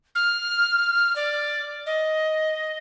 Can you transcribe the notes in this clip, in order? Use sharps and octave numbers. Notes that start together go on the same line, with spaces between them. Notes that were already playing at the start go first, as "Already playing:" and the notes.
F6
D5
D#5